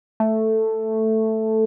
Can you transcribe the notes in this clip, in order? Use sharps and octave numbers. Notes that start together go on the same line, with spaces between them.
A3